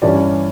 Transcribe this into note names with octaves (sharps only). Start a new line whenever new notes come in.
G2 E3 G3 C#4 D5